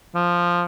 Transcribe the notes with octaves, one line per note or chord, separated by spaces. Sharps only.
F3